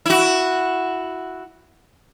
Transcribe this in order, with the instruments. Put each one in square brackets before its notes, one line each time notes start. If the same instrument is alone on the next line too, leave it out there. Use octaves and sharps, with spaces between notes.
[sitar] E4 F#4